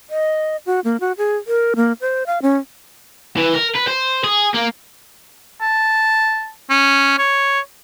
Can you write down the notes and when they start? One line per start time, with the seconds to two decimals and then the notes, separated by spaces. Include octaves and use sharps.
0.10 D#5
0.66 F#4
0.84 A#3
1.00 F#4
1.18 G#4
1.47 A#4
1.76 A#3
2.01 C5
2.26 F5
2.42 C#4
3.37 E3
3.53 A#4
3.75 B4
3.87 C5
4.24 G#4
4.55 A#3
5.61 A5
6.70 C#4
7.18 C#5